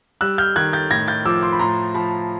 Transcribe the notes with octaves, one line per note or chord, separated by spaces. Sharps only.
G3 E6 F#6
F6 G6
D#3 F#6 G#6
G6 A6
A2 G#6 A#6
G6 A6
F3 D6 E6
C6 D6
B5
A2 A#5 C6
F3 A5 B5